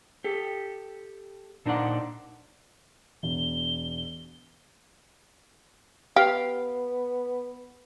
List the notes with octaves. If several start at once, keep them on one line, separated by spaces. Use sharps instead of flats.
G4 A4
A#2 D4 D#4 C5 D5 F#5
E1 G7
B3 G4 F5